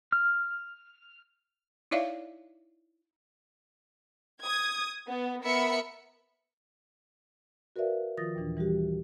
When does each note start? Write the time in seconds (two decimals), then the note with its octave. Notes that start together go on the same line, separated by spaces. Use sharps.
0.12 F6
1.91 D#4 E4 C#5 D5 E5 F5
4.42 D#6 G#6
5.06 B3
5.42 B3 A#4 E5 B5 C#7
7.76 F#4 A#4 B4 D5 E5 F5
8.17 D#3 F3 F4 D#6 A6 A#6
8.35 D#2 A#2 E3 D4
8.57 E3 G3 F#4 G4